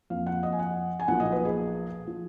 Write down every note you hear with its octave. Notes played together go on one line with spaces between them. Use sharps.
F2 F3 A#3 F5
F#5
D#5
G#5
F#5
G#5
B1 A#2 F3 A#3 F#5
D#5
B4
G#4
F3